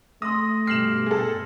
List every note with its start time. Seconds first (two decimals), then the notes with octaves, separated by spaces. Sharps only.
0.22 A3 C6 D#6 A#6
0.67 G2 B2 G4 F6 C7 E7 F#7
1.06 G#4 A4